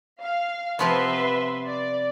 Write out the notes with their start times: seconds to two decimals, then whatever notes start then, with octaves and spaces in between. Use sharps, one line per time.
0.21 F5
0.79 C3 F3 B3 B4 E5 C6
1.66 D5